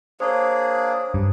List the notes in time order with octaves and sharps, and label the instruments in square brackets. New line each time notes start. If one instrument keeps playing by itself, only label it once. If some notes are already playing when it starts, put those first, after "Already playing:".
[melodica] A#3 D4 G#4 [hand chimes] C5 C#5
[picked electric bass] G2